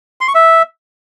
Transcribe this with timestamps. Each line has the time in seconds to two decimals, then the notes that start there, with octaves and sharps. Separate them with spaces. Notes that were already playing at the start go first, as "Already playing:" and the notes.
0.21 C6
0.28 C#6
0.35 E5